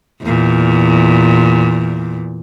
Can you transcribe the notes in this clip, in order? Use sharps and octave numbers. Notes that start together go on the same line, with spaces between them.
E2 A#2